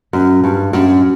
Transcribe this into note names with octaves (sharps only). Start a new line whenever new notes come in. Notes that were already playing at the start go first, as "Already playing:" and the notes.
F#2
G2
F#2